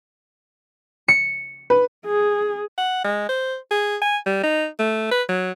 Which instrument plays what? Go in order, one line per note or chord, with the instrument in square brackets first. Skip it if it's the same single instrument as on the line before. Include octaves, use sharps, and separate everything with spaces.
[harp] C#7
[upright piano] B4
[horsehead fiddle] G#4
[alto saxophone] F#5
G#3
C5
G#4
G#5
G3
D#4
A3
B4
F#3